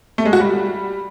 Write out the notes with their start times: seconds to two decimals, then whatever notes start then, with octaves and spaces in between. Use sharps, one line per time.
0.18 A3
0.26 G#3
0.33 F#4
0.40 G3